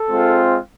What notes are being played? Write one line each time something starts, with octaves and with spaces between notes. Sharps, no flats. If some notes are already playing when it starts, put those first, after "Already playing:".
Already playing: A4
G#3 C4 F4